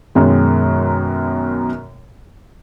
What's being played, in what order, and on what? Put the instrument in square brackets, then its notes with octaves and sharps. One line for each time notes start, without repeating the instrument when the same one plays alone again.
[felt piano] F#2 B2 D#3 G#3